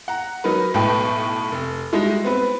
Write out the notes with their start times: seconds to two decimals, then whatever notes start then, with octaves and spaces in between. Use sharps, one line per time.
0.08 F#5 A#5
0.44 F#3 D#4 A#4 B4
0.74 B1 A2 A3 B4 G5
1.52 F1
1.92 G3 G#3 D#4 E4 F#4
2.24 B3 C4 B4